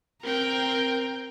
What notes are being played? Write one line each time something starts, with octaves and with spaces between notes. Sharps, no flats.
C4 A#4 G5